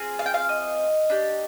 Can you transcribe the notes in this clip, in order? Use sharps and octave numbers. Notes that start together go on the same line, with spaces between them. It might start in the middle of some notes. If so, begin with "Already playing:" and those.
Already playing: C4 F4 G#4
F5
G5
F5
D#5
D4 G4